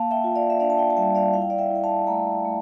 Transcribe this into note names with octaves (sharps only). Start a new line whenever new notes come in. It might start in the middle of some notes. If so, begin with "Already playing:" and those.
Already playing: A#3 F5 A5
E5 G5
F4
D5 F5
E5
D4 D5 F5
A5
E5 G5
A5
G3 E5 G5
D5 F5
E4 F5
G5
D5 F5
E5 G5
E4 G5
F5 A5
A3 G5 A#5
A3